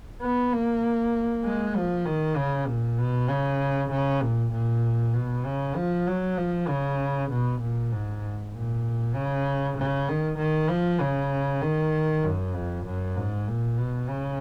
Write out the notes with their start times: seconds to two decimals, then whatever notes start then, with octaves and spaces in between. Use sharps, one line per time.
0.21 B3
0.52 A#3
1.44 G#3
1.76 F3
2.06 D#3
2.36 C#3
2.67 A#2
2.98 B2
3.29 C#3
3.91 C#3
4.22 A#2
4.53 A#2
5.14 B2
5.45 C#3
5.76 F3
6.07 F#3
6.38 F3
6.68 C#3
7.31 B2
7.61 A#2
7.92 G#2
8.54 A#2
9.15 C#3
9.78 C#3
10.08 D#3
10.38 D#3
10.69 F3
11.01 C#3
11.62 D#3
12.24 F#2
12.55 F2
12.86 F#2
13.17 G#2
13.48 A#2
13.78 B2
14.09 C#3